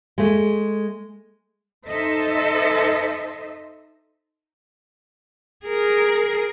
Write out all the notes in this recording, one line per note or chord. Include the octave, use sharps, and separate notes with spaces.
G#3 A3
D#4 A4 C5 D#5 E5
G#4 A#4